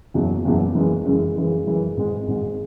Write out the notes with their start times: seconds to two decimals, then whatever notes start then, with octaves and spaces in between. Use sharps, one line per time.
0.14 F#1 E2 B2 F#3
0.45 F#1 E2 B2 F#3
0.75 F#2 C#3 E3 G#3
1.05 F#2 C#3 E3 G#3
1.36 F#2 C#3 E3 G#3
1.66 F#2 C#3 E3 G#3
1.97 G#1 G#2 G#3
2.28 G#1 G#2 G#3